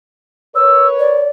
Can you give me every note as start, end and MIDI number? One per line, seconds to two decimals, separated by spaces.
0.56 1.29 70
0.56 1.29 71
0.56 1.29 73
0.56 0.88 88
0.99 1.30 74